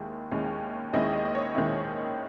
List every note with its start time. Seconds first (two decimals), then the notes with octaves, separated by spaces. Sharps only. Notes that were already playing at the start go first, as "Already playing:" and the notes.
Already playing: D#2 D#3 G#3 E4
0.31 D#2 D#3 G#3 C#4 E4
0.93 D#2 D#3 G#3 C#4 E4 D#5
1.13 D#5
1.25 D#5
1.35 C#5
1.55 D#2 D#3 G#3 C#4 E4